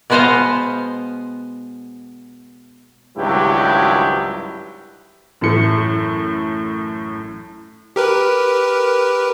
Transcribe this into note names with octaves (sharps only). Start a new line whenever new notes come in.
B2 G#3 B3 C5 D#5 F5
G#1 C#2 G2 F#3 E4 G4
A1 F#2 A2 A3 C#7
G4 A#4 B4